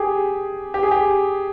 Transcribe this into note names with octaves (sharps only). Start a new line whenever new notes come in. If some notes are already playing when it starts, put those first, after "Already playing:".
Already playing: G4 G#4
G4
G#4
G4